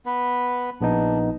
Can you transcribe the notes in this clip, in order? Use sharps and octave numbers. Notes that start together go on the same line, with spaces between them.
B3 B4
A#1 B3 D4 D#4